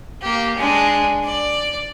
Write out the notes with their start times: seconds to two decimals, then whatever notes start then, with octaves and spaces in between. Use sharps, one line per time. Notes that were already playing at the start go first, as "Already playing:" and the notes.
0.21 A#3 G4
0.57 G#3 D4
1.24 D5